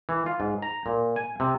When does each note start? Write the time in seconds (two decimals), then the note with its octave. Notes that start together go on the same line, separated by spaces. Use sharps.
0.09 E3
0.26 F4
0.40 G#2
0.62 A#5
0.86 A#2
1.16 G#5
1.40 C3